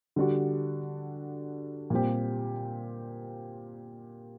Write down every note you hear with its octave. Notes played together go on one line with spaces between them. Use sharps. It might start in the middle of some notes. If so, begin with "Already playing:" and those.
D3 G3 D4 F#4
A#2 G3 C4 G4